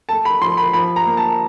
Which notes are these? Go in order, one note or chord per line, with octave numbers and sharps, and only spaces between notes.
A3 A5
B5
F3 C6
B5
F3 B5
A#5
A#3
A5